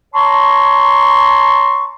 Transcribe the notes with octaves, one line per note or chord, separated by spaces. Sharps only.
C#5 A5 A#5 C6 C#6